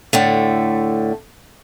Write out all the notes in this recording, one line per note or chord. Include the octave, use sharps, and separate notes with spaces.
A2 D3 A3